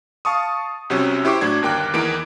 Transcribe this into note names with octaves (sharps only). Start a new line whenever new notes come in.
F5 A5 C#6 D#6
C2 C3 F#3 C#4
E4 G4 C5 C#6 D6
A2 F#3 D4 G#6
G1 D#2 A#3 G5 D6 F#6
E2 D#3 E3 A#3 D7